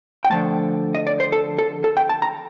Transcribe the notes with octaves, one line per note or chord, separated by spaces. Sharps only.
G5
D3 F3 A3 A5
D#5
D5
C5
A4
A4
A4
G5
A5
A#5